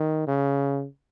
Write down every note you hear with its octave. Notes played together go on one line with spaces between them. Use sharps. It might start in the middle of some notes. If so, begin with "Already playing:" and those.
Already playing: D#3
C#3